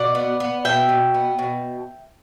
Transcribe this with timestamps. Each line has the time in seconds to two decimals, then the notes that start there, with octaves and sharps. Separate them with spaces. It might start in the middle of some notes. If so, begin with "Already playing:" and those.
Already playing: B2 D5 F#5
0.15 B3
0.40 B3
0.65 B2 E5 G5
0.89 B2
1.14 B3
1.39 B2